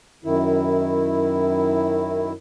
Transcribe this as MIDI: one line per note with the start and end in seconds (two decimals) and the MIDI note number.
0.25 2.33 42
0.25 2.33 51
0.25 2.33 64